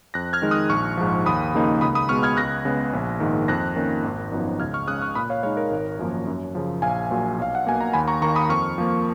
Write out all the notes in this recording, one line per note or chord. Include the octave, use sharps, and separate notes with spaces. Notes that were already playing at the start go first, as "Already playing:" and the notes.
F2 F#6 A#6
F6 G#6
D#3 G#3 D#4
D#6 F#6
A#1 C#6 F6
G#2 F3
D#2 B5 D#6
C#3 F3 A#3 D#4
C#2 B5 D#6
B5 D#6
B2 G#3 B3 C#6 F6
F6 G#6
C#2 F#6 A#6
C#3 G#3 B3
A#1
G#2 D#3 A#3
F2 F#6 A#6
D#3 A#3 C#4
G#1
F#2 F3 B3 D#4
C#2 F6 G#6
C#6 F6
C#3 G#3 D#6 F#6
C#6 F6
A#2 B5 D#6
C#5 F5
G#3 D#4 C#5 F5
A#4 C#5
G#1
F#2 F3 A#3 C#4
F#2
C#3 F3
A#1 F5 G#5
A#2 F#3
B1 F5
F#5
B2 A#3 G#5
A#5
D#2 G#5 B5
A#5 C#6
D#3 A#3 A#5 C#6
B5 D#6
F2 C#6 F6
F3 A#3